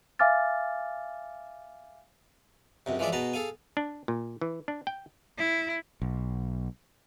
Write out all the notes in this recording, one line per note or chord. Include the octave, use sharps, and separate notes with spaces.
E5 F5 G#5 D6 F6 A6
C#2 F#2 C3
E3 F3 G#3 D5 E5
B2 G#4 B4 A5 A#5
G#4 A4 F5 G#5
D4
A#2
E3
D4
G5
E4
B1